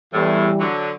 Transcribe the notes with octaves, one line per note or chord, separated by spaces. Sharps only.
E2 A2 E3 G3
D3 F#3